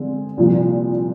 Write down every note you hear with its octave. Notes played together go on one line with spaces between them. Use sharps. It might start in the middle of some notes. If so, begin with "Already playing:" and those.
Already playing: D3 G#3 C4
C2 A#2 F3